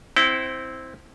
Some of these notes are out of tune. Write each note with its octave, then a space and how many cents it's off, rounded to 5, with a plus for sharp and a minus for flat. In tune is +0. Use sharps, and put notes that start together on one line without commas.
C4 +0 E4 -15 G5 -35